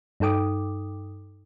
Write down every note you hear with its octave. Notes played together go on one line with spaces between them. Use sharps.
G2 D#4 A4 G5 D6 D#6